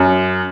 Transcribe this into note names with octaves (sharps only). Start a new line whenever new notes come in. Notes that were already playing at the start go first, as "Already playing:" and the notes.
Already playing: F#2